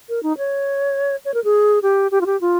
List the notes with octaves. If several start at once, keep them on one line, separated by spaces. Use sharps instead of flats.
A#4
D#4
C#5
C#5
A#4
G#4
G4
G4
F4
G4
F4